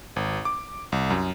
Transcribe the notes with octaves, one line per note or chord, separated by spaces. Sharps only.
G#1
D6
C2
F#2